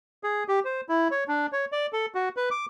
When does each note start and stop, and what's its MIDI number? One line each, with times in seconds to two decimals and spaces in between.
0.23 0.44 68
0.48 0.60 67
0.65 0.81 72
0.89 1.08 64
1.11 1.24 73
1.28 1.47 62
1.52 1.65 73
1.72 1.86 74
1.93 2.06 69
2.15 2.29 66
2.37 2.49 71
2.51 2.66 86